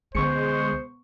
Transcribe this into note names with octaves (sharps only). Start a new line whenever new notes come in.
C#2 D3 G#3 B3 C5 C#6 C#7